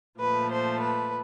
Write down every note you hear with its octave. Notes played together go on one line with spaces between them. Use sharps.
A#2 F3 A3 B4
C5
B4